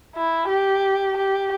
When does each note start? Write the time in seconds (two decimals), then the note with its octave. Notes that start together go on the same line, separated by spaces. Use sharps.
0.16 E4
0.49 G4
1.17 G4